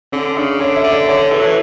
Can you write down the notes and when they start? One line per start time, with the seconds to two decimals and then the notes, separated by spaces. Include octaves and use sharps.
0.12 D3 C#4
0.36 C#3 D4
0.60 D3 C#5
0.76 E5
0.84 D3
0.92 D5
1.08 D3 C#5
1.31 E3 A4
1.39 F#3
1.46 E3